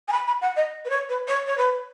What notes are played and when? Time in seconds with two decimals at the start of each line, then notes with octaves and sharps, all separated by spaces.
0.08 G#5
0.12 B5
0.27 B5
0.41 F#5
0.56 D#5
0.85 B4
0.90 C#5
1.09 B4
1.28 C#5
1.47 C#5
1.57 B4